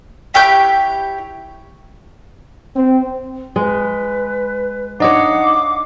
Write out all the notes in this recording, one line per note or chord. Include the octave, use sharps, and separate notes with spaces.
E4 G4 C#5 G6
C4
G#3 B4
D4 D#4 C#5 D#5 F5 F#5 D6